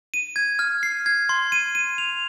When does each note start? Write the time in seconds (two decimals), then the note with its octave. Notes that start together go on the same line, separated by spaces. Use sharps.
0.14 D#7
0.36 G#6
0.59 F6
0.83 C7
1.06 G#6
1.29 C6
1.52 D#7
1.75 D#7
1.98 F7